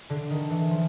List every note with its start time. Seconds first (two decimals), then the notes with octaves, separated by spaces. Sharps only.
0.10 D3
0.30 D#3
0.50 E3
0.71 F3